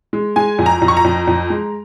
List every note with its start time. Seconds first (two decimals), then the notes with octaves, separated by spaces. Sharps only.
0.13 G#3
0.36 G#3 G#5
0.58 F2
0.66 A#5
0.82 F2
0.88 C#6
0.97 A#5
1.04 F2
1.27 F2
1.50 G#3